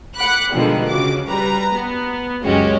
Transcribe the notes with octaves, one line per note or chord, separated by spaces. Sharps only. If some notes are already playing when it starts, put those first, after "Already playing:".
F#5 B5 D6 F#6
B2 D3 D#3 F3 G3 G#3
C#3 F#4 D6
G3 B4 A#5
B3
C#2 F#2 G#3 C#4 F#4 G4